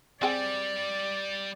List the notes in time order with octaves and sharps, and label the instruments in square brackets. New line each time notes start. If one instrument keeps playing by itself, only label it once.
[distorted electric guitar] G3 [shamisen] C4 G#4 G5 [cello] D5